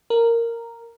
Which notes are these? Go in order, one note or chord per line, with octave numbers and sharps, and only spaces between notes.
A#4